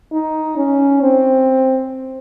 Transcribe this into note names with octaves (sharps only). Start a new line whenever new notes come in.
D#4
C#4
C4